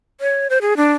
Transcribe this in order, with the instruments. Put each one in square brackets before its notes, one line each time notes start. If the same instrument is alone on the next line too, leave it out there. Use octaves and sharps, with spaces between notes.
[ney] C#5
C5
G#4
D4